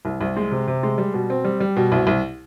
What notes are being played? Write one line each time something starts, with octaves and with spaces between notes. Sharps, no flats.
C2
C2
G#3
C3
C3
G#3
G3
B2
C4
G3
G3
B2
C2
C2